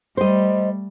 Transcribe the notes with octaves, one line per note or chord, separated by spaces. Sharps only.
G3 A3 C5 D#5